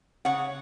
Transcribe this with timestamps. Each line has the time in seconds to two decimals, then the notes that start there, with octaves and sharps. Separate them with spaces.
0.25 C#3 C#5 F#5